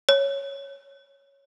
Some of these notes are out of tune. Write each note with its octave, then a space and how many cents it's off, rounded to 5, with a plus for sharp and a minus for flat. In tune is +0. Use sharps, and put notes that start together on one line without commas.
C#5 -5